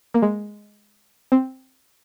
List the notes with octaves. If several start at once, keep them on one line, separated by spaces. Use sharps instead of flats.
A#3
G#3
C4